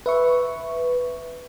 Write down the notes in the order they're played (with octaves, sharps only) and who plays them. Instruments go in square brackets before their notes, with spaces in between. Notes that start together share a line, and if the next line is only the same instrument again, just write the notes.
[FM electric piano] B4 E5 C#6